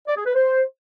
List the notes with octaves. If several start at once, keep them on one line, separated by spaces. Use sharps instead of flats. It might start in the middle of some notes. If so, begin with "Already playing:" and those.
D5
G#4
B4
C5